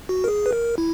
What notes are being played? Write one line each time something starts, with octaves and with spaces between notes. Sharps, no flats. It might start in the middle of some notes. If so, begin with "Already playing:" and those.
F#4
A#4
G#4
B4
A#4
E4